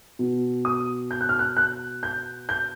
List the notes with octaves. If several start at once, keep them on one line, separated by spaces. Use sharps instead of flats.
B2
D#6
G6
F#6
F6
F#6
F#6
G6
G6